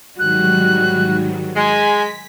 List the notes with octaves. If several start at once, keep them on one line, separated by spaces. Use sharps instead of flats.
G#2 D#3 F#3 G3 F#4 F#6
G#3 G#5 B6